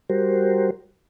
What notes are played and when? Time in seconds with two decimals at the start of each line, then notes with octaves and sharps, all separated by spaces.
0.10 G3 F#4 G4 A#4 C5